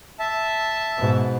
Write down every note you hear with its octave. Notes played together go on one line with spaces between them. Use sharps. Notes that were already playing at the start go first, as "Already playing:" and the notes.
E5 A5
G#2 B2